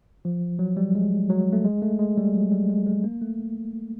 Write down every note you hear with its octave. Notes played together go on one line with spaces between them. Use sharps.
F3
F#3
G3
G#3
F#3
A3
G#3
A3
G#3
G3
F#3
G3
G#3
G#3
A#3
A3